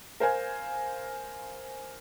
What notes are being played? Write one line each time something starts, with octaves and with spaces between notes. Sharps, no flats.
A#4 C5 F5 G#5